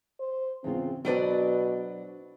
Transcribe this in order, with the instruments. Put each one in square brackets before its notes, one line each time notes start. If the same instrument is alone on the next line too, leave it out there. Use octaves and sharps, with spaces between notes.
[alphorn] C5
[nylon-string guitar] E2 C#3 F4 [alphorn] C4
[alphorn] B2 [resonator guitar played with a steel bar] F#3 B4 D5 [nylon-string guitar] D4 C5 G5